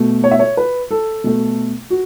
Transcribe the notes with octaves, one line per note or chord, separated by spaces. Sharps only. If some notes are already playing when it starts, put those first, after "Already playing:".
Already playing: B2 A3
C#5
E5
C#5
B4
A4
B2 A3
F#4